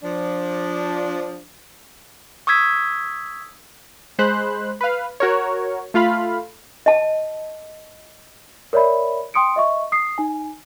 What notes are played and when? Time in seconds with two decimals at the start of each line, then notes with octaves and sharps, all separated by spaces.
0.02 F3 D4
2.47 C#6 D#6 E6 G#6 B6
4.19 G#3 C5 B5 F#6
4.81 B4 F5
5.20 F#4 A#4 C#5
5.94 A3 F4 F5 B5
6.86 D#5 A5
8.73 A#4 C#5 D5 E5 B5
9.34 G5 C6 D#6 C#7 D7
9.56 D#5 E5 C#6
9.92 D#6 C7
10.18 D#4 G#5